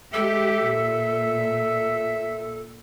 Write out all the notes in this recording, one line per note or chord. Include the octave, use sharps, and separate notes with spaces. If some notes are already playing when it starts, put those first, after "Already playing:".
G#3 G4 A4 E5
A#2